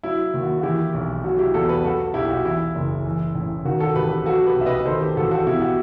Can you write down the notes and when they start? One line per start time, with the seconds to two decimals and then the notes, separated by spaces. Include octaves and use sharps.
0.03 F#3 E4
0.34 D#2
0.43 F#4
0.58 F#4
0.63 E3 E4 G4
0.94 B1
1.24 F#3 F#4
1.39 E4 G4
1.54 E2 F#4 A4
1.69 G4 B4
1.84 F#3 F#4 A4
2.14 B1 E4 G4
2.30 F#4
2.45 E3 E4
2.75 F#1
3.05 E3
3.35 A1
3.65 D#3 F#4
3.80 F#4 A4
3.95 A1 G4 B4
4.10 G4 B4
4.26 F#3 F#4 A4
4.45 G4 B4
4.56 B1
4.61 E5
4.66 B4 D#5
4.86 D#3 A4 C5
5.01 G4 B4
5.16 A1 F#4 A4
5.31 F#4 A4
5.46 B2 E4 G4
5.62 F#4